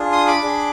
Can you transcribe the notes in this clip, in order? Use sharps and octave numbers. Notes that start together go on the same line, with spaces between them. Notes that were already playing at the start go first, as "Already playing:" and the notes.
Already playing: D4 F4 G#4
C6 D#6
B5 D6
D4 G#4